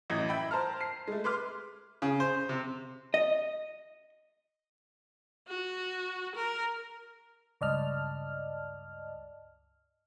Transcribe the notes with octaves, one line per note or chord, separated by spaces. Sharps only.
A1 F#2 E3 D#5 G#6 A#6
E5 G5 B5
C5 A5 A#5 F6
C7
G#3 A3
B4 C6 D6 F6
C#3
C5
C3
D#5
F#4
A#4
C#2 G2 D5 D#5 A5 F6